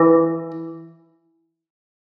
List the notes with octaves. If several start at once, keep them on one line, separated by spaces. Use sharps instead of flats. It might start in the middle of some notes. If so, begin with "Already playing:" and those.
Already playing: E3